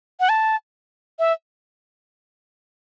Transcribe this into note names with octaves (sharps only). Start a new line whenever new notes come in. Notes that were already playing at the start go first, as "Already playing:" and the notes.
F#5
A5
E5